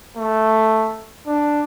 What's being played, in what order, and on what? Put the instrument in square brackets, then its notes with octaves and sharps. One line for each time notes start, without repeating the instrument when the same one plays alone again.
[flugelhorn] A3
D4